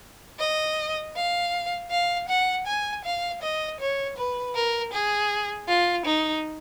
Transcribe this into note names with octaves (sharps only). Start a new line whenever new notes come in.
D#5
F5
F5
F#5
G#5
F5
D#5
C#5
B4
A#4
G#4
F4
D#4